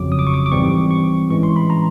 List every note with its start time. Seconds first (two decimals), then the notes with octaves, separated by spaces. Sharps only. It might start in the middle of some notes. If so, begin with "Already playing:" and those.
Already playing: G1 F2 C#3 F#3 D6
0.12 D#6
0.19 D6
0.27 C#6
0.34 D6
0.46 D6
0.52 G#1 G#2 E3 G3 C4 C#6
0.91 C#6
1.30 A2 E3 G#3 C#4 C#6
1.43 C6
1.56 B5
1.70 A#5